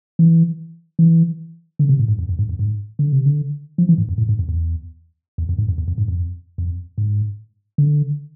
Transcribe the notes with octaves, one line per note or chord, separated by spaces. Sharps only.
E3
E3
D3
C3
A2
G#2
F2
F2
G#2
F2
G#2
D3
C3
D3
F3
E3
G#2
F2
A2
G#2
F2
E2
E2
F2
G#2
F2
E2
F2
G#2
F2
F2
G#2
D3